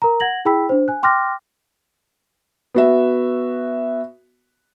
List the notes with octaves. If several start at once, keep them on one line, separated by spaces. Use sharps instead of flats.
A#4 A#5
F#5 G#6 A#6 F#7
E4 G#4 G5 B5 E6 B6
D4 C5
G#5 F#6
G5 C6 D6 F6 F#6 A#6
B3 F#4 E5